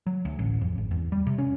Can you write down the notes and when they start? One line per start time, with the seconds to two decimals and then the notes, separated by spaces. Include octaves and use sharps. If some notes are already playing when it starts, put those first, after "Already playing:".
0.06 F#3
0.25 D2
0.39 A1
0.61 F2
0.78 G#1
0.91 E2
1.12 G3
1.26 C3
1.38 C#4